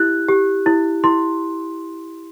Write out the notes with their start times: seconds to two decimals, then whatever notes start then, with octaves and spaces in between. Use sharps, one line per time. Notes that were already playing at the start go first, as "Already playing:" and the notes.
Already playing: E4 G4 F#6
0.29 G4
0.66 E4
1.04 E4 C6